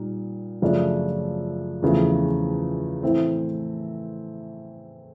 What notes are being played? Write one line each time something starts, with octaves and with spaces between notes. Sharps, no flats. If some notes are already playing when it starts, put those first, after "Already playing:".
Already playing: A#2 G3 D#4
F#2 C#3 F3 A3 D4
E2 C#3 F3 A3
A2 E3 A3 C4